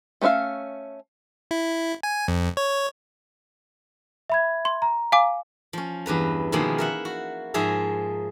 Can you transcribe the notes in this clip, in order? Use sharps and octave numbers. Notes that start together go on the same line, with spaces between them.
A3 C#4 B4 E5 F5
E4
G#5
F2
C#5
E5 B5 G#6
C6
A#5
F5 G#5 D6
F3 C#4
E2 G2 B4 A#5
B2 D#3 F3 G#3 A#3 E4
A#4 E5 F#5
F#4
G#2 F3 G#4 E5 A#5